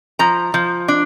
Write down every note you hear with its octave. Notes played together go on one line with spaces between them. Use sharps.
F3 A#5
F3
D4